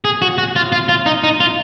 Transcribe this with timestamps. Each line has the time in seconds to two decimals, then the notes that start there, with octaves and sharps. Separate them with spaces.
0.05 G#4
0.22 F#4
0.38 F#4
0.56 F4
0.72 F4
0.89 F4
1.06 D#4
1.24 D#4
1.40 F4